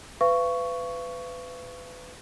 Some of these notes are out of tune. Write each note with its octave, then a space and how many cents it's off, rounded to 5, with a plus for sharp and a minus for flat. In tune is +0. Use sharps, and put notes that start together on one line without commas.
B4 +25 F5 -40 C#6 +5